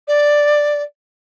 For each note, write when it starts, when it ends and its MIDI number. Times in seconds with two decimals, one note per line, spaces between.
0.08 0.83 74